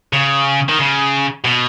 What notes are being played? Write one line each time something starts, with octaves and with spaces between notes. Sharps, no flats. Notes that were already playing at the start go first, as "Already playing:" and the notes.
C#3
D#3
C#3
B2